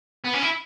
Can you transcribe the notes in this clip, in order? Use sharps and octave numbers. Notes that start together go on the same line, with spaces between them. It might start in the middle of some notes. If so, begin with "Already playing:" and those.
B3
C#4
E4